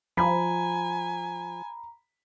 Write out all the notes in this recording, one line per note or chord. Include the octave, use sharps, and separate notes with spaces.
F3 G#5 A#5 B5